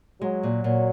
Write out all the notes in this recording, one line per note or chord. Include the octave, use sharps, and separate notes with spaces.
F#3 G#3
A#2
A#2